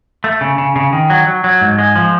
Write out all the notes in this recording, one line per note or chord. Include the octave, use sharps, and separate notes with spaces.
A3
C#3
C#3
C#3
D#3
F#3
F#3
F#3
G#2
G#3
F3